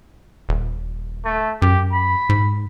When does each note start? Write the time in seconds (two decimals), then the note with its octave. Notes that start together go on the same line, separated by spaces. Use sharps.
0.49 D#1
1.25 A3
1.62 F#2 G4
1.92 B5
2.29 G#2